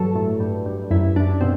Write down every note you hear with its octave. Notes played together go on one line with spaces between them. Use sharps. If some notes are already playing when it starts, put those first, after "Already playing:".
Already playing: G2 F#3 A4
A2
G2
G2
F#2 E4
F#2 D4
B2 C4